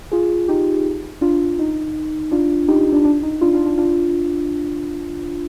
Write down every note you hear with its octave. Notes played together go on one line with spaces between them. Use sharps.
F4 G#4
D#4 G4
D4 F4
D#4
D4 F4
D#4 G4
D#4
D4
D4
D#4
D4 F4
D4 F4
D4 F4
D4 F4